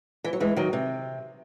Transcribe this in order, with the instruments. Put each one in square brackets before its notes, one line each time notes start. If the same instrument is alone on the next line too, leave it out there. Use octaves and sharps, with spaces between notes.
[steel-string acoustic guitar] E3
F#3
E3 G#3
D#3 F#3
C3